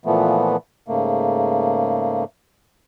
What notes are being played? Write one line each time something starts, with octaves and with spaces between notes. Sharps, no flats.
A#2 E3 F3 A3 B3
G#2 C#3 A3 A#3